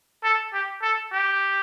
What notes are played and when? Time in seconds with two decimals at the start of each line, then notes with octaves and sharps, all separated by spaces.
0.24 A4
0.53 G4
0.82 A4
1.13 G4